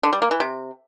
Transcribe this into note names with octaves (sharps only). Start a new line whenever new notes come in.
D3
G3
A#3
E3
C3